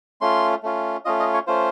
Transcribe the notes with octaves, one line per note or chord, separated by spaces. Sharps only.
A3 C#4 F4 C6
A3 C#4 F4
A3 C#4 F4 D#5
D#5
C#5
A3 C#4 F4 C5